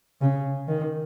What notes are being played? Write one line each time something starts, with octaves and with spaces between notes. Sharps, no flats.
C#3
D#3